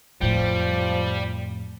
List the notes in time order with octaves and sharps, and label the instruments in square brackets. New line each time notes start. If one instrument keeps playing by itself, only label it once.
[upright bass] F2 A2 [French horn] F3 [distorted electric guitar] G3